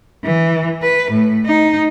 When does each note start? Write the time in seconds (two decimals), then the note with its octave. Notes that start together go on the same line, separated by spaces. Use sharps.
0.24 E3
0.82 B4
1.11 A2
1.46 D#4